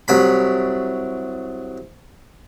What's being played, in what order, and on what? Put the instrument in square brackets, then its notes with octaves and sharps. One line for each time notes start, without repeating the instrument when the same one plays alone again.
[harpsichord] C2 F#3 B5